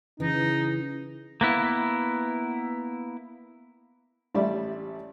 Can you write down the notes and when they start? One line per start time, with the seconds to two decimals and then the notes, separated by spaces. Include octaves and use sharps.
0.20 C#3 E3 D#4
1.41 A#3 B3 E4
4.35 A1 G3 D5 E5